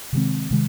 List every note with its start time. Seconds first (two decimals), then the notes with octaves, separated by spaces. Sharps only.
0.13 C3 D#3 G#3 C4
0.51 C3 D#3 G#3